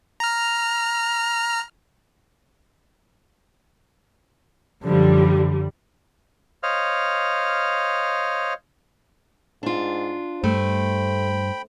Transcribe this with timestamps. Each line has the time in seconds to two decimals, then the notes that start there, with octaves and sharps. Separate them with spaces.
0.20 A#5 F6
4.83 F#2 D3 F3 G3
6.63 C5 C#5 D#5 F5 F6
9.63 G#2 D4 F4
10.44 G2 A3 C5 G5 B5